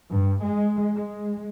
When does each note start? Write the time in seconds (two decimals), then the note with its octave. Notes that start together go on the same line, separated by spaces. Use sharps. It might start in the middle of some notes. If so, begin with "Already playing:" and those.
0.11 G2
0.44 G#3
0.95 G#3